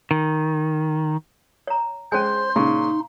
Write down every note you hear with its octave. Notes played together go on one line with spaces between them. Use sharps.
D#3
C#5 A#5
G#3 C#4 C5 C#5 G#5 C6
A#2 C#3 D#4